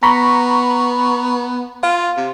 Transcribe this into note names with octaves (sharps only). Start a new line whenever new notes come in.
B3 A#5 B5 C#6
F4 F5
C3